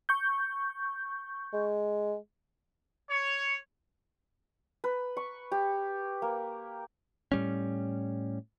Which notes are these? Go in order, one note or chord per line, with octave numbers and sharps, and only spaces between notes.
C#6 G6
G#3
C#5
B4
C#6
G4
A#3
A2 G3 C#4